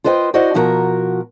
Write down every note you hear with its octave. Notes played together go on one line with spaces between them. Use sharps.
F4 B4 C5 D#5 F5 G5
E4 F#4 C5 D5 D#5 F#5
B2 F3 E4 F#4 A#4 A#5